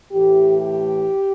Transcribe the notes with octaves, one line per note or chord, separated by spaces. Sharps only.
A2 E3 A3 G4
G4